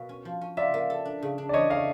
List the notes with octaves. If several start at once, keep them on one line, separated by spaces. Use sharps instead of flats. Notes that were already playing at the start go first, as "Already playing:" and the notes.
Already playing: B2 F#3 A#3
C#4
F3
C#4
F4 D5 E5
A#3
A4
D4
C#3
D4
D5
E3 C#5 D#5
A3 D#5 F5